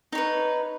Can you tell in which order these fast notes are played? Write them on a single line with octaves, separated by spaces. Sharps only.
D#4 C#5 B4